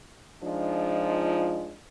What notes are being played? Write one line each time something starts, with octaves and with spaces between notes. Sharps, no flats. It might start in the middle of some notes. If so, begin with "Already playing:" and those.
F3 G#3 D4 D#4 F4